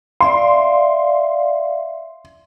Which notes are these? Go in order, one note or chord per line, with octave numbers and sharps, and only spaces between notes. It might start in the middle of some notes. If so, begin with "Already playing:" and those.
D5 E5 F5 C6